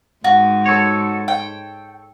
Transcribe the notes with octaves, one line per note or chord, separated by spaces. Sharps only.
G#2 G#3 F#4
A4 C#5
G5